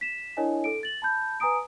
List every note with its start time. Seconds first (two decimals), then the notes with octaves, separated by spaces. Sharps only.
0.01 B6 E7
0.37 D4 E4 A#4 C#5 D#5 G#5
0.64 A4 D7
0.83 A6 F#7
1.02 A5 B5 G6
1.40 B4 G#5 A#5 D#6 D7